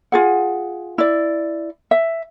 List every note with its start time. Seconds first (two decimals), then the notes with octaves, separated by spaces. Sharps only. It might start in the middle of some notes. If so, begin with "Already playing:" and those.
0.12 F4 G#4 F#5
0.98 E4 D5
1.91 E5